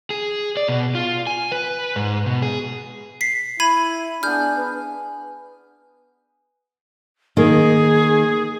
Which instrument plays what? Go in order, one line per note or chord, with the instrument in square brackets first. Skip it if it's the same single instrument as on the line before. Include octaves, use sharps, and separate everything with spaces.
[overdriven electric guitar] G#4
D5
B2
F4
G#5
B4
G#2
B2
G#4
[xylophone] B6 C7
[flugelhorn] E4 [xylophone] B5 G#6 D#7
[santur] B3 G#4 [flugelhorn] D4 [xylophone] F6 G6
[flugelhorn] B4
[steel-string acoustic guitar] D#3 A#3 D#4 [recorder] G#4